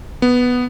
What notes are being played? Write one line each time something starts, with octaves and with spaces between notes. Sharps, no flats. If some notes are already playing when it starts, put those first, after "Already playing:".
B3